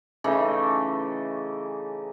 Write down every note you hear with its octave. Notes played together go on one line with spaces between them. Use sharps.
C#3 E3 A3 D#4